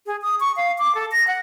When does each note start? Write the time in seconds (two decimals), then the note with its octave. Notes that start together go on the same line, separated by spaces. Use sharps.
0.06 G#4
0.22 D#6
0.40 C#6
0.56 F5
0.79 D6
0.95 A4
1.12 A#6
1.27 F#5